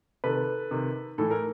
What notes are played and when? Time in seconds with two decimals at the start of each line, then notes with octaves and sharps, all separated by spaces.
0.24 C3 D#3 A4 B4
0.71 C3 D#3
1.18 A2 E3 A4
1.31 A#4